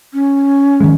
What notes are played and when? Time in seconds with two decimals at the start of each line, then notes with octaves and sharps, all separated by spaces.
0.13 C#4
0.80 D#3 F3 G#3